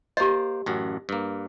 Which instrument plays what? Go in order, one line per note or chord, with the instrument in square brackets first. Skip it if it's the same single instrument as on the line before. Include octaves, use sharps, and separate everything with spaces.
[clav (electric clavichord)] A#3 C5 [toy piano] G4 D#5
[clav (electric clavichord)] A1 F#2 F#4
G2 A#3